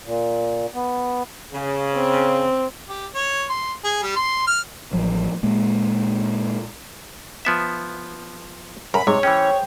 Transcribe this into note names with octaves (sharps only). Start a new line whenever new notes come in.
A#2
B3
C#3
C4
G4
C#5
C6
G#4
G3
C6
F6
A1 F3 F#3
A#2 G#3 A#3
F3 B3 E5
F#2 A#4 B5
G#2 C3 C#5
E3 C#4 G#4 C5 G5